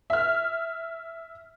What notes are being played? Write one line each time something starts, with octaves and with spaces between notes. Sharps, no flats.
E5 F6